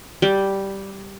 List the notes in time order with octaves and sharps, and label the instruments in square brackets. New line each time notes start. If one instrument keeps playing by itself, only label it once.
[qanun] G3